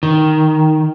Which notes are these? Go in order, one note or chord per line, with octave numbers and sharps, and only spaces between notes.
D#3